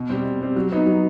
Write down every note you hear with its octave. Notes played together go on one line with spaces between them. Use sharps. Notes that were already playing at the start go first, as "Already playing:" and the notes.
Already playing: B2
G3 C4
B2
G3 C4
F#3
B3 D#4
F#3